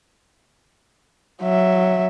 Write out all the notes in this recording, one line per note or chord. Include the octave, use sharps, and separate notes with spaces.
F#3 E5